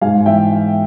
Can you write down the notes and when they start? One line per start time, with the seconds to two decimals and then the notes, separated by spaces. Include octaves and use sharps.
0.01 G#2 F5 G#5
0.26 E3 E5 G5